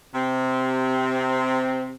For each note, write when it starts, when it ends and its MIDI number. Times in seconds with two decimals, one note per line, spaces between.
0.15 1.93 48
0.15 1.93 60